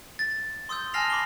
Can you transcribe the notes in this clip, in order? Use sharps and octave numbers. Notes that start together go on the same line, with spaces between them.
A6
C6 D#6 E6 G6
G#5 A5 F6 A#6 C7 F7
B5 D6 C7 G7